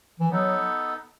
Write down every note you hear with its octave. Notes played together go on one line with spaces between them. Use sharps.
E3
F#3 B3 D#4 A4